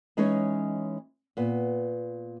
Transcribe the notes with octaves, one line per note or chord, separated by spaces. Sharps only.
E3 G#3 C#4 D#4 C#5 D#5
A#2 B3